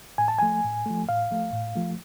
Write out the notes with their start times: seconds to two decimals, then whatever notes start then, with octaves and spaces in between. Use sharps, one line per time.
0.18 A2 G#5
0.28 A5
0.39 F3 A3 G#5
0.64 A2
0.86 F3 A3
1.09 A2 F5
1.31 F3 A3
1.53 A2
1.76 F3 A3